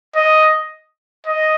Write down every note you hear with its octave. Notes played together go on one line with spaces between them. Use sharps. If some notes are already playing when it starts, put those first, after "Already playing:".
D#5
D#5